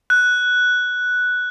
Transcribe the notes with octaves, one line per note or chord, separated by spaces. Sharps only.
F#6